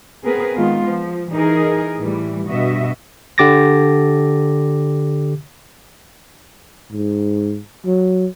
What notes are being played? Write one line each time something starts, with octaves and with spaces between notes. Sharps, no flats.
B3 C4 G#4 A#4 B4
D#3 G#3 B3 F4
F3
E3 D#4 G#4 A#4
A2 E3 G3
G2 B2 F#4 D#5 E5
D3 G4 D6 A6 A#6
G#2
F#3